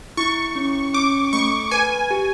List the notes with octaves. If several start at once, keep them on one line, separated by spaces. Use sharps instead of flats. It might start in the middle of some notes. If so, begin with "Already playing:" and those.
E4 C#6
C#4
C#4 D6
A3 C#6
B4 G#5
G4